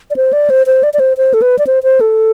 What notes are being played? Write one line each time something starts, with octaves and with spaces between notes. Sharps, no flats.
D5
C5
D5
C5
C5
D5
D5
C5
C5
A4
B4
D5
C5
C5
A4